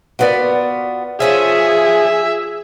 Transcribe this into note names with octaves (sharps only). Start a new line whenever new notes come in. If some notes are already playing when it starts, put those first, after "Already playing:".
B3 F4 F#4 A#4 B4 D5
F3 C#4 F4 G#4 E5